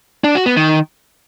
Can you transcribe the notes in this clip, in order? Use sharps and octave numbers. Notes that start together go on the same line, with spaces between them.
D4
F#4
B3
D#3